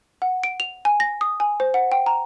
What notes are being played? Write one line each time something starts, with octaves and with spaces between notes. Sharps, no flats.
F#5
D7
F7
G#5
A#6
D#6
G#5
C5
F#5
G5
A#5